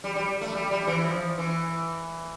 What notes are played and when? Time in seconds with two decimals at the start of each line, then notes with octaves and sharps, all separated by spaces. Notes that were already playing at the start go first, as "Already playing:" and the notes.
0.04 G3
0.16 G3
0.41 A3
0.55 G3
0.71 G3
0.87 E3
1.04 F3
1.38 E3